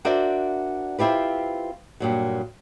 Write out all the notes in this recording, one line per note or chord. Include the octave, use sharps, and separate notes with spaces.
D4 F#4 A#4 C5 D5 E5
C4 E4 F4 G4 B4
G2 A#2 F#3